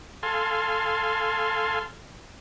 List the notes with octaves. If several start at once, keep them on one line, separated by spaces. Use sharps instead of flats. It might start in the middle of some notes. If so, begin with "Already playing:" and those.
A4 F5 G#5 C6